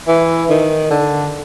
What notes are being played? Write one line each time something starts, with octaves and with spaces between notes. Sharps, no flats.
E3
D#3
D3